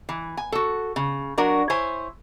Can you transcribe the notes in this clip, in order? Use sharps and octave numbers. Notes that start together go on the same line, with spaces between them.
E3
G#5
F#4 A4
C#3
F#3 D4 F#4 A#4
E4 C5 C#5 G#5